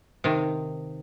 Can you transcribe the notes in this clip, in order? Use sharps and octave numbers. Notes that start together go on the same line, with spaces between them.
C3 D#3